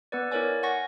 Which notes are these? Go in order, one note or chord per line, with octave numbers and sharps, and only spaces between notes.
B3 B4 D5
E4 A#4 C#5 D5 G#5
F#5 G#5 C#6 A#6